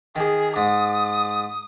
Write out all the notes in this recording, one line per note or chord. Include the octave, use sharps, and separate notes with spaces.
D#3 G#4
G#2 D#6